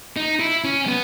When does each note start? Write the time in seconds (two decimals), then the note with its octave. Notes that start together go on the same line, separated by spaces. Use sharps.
0.16 D#4
0.40 E4
0.64 C#4
0.87 B3